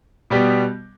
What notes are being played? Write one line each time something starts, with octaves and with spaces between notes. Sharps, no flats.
B2 G3 B3 G4